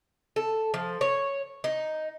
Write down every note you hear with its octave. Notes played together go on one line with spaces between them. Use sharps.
A4
F3
C#5
D#4